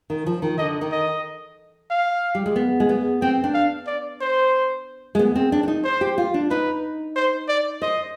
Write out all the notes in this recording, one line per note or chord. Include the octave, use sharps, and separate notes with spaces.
D#3
F3
D#3
D3 D#5
D#3
D#5
F5
G3
G#3
B3
G#3
B3
C4 G5
D4
F5
D5
C5
G#3
B3
C4
D4
D4
D#4
C5
G4
F4
D4
D#4 B4
C5
D5
C5 D#5